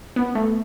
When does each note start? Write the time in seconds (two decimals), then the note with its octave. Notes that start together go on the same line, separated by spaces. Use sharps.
0.16 B3
0.35 A3